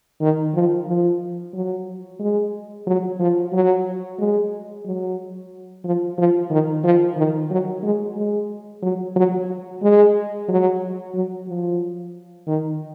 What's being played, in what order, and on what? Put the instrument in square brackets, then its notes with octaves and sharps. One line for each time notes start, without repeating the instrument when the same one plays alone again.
[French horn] D#3
F3
F3
F#3
G#3
F#3
F3
F#3
G#3
F#3
F3
F3
D#3
F3
D#3
F#3
G#3
G#3
F#3
F#3
G#3
F#3
F#3
F3
D#3